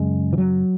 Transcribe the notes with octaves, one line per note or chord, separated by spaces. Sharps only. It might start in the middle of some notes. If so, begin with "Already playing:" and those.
Already playing: F#2 C#3 G#3
E3
F#3